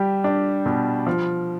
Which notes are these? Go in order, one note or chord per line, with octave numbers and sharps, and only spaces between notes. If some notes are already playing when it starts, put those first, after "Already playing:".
Already playing: G3 G4
D4
B2
F3